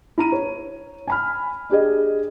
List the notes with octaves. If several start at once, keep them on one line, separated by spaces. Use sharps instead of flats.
E4 A#5 D#7
C#5
G#5 B5 F6
D4 G4 G#4 D#5